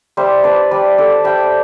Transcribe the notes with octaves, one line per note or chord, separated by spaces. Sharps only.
G3 C5 E5
D4 B4 D5
G3 B4 D5
D4 A4 C5
G3 E5 G5